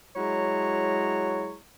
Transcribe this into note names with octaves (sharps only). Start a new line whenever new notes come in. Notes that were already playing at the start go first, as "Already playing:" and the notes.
F#3 G#3 E4 C#5 A#5